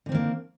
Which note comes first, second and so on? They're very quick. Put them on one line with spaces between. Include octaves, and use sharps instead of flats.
D3 C4 D#3 A#3